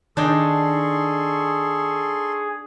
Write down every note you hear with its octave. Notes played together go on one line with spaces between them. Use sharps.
D#3 D4 D#4 G#4 A4 G5 C6 C#6